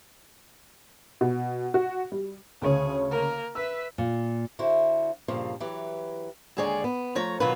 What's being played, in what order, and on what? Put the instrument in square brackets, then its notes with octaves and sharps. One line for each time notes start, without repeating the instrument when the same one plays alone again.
[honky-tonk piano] B2
F#4
G3
[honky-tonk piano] D2 C#3 C#5 [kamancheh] G#4
[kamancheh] A#3 A#4
[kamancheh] B4 E5 [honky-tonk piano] E6
[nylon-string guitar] A#2
[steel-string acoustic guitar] D3 E4 F#4 C5
G2 A#2 C#3 F3
E3 F#3 G4 B4
D#2 D3 G#3 G#4 C#5 D5
B3
F3 A3 C#5 A#5
B2 D#3 F#3 B3 F4 B4